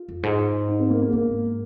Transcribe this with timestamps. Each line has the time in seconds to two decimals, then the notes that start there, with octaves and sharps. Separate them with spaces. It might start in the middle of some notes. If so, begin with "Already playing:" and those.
Already playing: F4
0.09 F2
0.23 G#2
0.68 D#4
0.80 C4
0.90 A#3
1.02 A#3
1.13 G#2 A#3